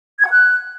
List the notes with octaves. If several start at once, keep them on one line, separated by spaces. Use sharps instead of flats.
G#6
F#5
F#6